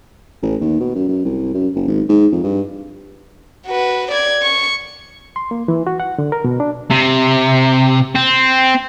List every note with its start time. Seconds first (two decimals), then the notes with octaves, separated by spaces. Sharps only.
0.42 A1
0.61 D#2
0.80 B2
0.95 F#2
1.09 F#2
1.25 C2
1.54 F#2
1.75 F#1
1.88 G#1
2.09 G#2
2.32 F2
2.44 G2
3.66 F#4 B4
4.11 D5 G#6
4.42 C#6
5.36 C6
5.51 A#3
5.68 E3
5.87 F#4
6.00 F#5
6.18 D3
6.32 A#4
6.44 B2
6.60 D4
6.90 C3
8.15 C4